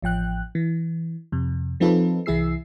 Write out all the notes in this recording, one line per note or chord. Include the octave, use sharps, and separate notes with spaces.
A1 F3 G5 F#6
E3
F2 C3
F3 C4 D#4 F4 A4 B4
C2 E3 E4 G#4 E6 C7